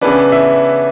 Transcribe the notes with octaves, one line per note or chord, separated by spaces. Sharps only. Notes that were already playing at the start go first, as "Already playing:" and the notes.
C#3 E3 B3 D4 B4
E5